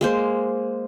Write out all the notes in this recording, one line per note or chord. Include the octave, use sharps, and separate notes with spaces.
G#3 A#3 C5